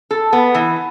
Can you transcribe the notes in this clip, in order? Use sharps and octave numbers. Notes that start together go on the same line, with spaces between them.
A4
B3
E3